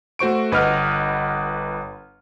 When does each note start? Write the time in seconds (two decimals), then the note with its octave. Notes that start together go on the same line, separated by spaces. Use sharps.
0.19 A3 F#4 C5 C#6 D7
0.52 G1 B4 D#5 F#5 F6